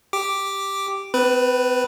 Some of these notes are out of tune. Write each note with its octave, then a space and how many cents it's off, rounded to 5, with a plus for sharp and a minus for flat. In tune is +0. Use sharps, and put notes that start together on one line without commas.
G4 +0 D6 +0
C4 -40 B4 +0